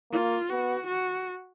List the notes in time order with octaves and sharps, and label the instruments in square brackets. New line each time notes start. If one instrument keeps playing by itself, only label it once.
[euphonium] A#3 [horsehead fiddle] F4
[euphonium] B3 [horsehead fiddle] F#4
[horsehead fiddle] F#4